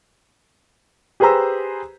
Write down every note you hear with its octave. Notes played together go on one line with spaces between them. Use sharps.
G4 G#4 B4 C5 A#5 E6